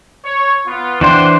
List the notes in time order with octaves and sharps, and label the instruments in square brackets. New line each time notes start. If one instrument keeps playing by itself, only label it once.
[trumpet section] C#5
B3 F4
[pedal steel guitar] E3 D4 C5 [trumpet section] F#5 G5 C6